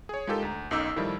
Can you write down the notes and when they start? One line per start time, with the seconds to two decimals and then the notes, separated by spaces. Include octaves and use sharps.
0.09 G#4 C#5
0.27 G#3 D#4 F4 G4 A4 A#4
0.42 D2 A#5
0.71 B1 F#2 D#4 D6 E6 F6
0.96 A2 D#3 F3 G3 E4